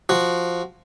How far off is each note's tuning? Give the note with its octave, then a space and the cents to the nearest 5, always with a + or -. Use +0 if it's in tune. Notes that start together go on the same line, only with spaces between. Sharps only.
F3 +0 F#4 +0